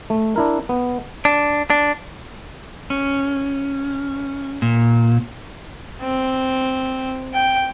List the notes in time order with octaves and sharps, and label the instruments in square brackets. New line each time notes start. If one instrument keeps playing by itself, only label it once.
[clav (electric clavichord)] A3
D4 E4 A#4
B3
[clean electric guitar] D4
D4
[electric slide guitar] C#4
A#2
[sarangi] C4
G5